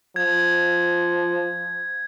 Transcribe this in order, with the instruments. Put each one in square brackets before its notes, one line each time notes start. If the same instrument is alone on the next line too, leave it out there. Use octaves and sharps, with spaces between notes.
[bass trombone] F3 [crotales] G#6